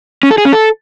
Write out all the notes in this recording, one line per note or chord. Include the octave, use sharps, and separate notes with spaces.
C#4
A4
G#4
C#4
A4